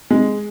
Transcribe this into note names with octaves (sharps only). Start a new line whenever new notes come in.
G#3